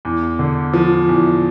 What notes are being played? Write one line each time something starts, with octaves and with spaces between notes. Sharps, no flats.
E2
D3
F3
E2